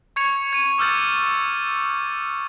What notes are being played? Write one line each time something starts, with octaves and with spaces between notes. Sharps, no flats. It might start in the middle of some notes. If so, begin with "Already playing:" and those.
C#6 G#6 C#7 F7
G#6 D#7
D6 E6 F6 G6 A6 F#7